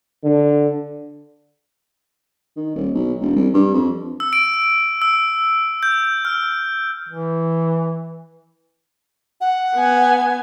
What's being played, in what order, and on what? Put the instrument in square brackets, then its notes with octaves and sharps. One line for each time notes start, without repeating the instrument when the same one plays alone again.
[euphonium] D3
[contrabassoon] D#3
D#1
B1
E1
C2
G2
F2
[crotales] E6
D7
E6
G6
F6
[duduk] E3
[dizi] F#5
[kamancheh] B3 G#5